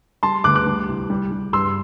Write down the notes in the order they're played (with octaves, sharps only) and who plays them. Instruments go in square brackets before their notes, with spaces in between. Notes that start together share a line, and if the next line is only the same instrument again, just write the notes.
[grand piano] G3 A5 C6
D2 D6 F#6
D6 F#6
G3
C2
G3
G3
G2 C6 E6